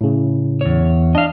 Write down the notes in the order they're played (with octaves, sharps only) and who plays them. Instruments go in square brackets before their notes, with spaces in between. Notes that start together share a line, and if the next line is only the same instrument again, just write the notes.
[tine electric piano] A2 C#3
[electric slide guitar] E2 C#5
[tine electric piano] D4 [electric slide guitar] D#5 F5